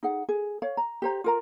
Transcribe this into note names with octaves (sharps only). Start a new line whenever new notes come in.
D#4 G#4 F#5
G#4
C#5 F5
A#5
G4 C5 A#5
F4 A#4 A#5